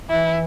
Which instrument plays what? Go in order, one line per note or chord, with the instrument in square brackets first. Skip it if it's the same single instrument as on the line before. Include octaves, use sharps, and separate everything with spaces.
[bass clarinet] E3 [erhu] E4